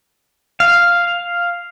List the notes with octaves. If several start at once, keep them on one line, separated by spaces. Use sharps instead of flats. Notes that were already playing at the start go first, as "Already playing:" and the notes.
F5